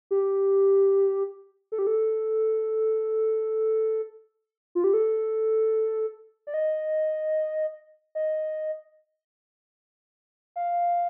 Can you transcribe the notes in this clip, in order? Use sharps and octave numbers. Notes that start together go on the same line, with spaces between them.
G4
A4
G4
A4
F4
G4
A4
D5
D#5
D#5
F5